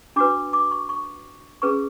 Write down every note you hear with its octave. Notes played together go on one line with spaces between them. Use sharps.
D4 F#4 B4 D6
D6
C#6
C#6
C#4 G#4 B4 C#6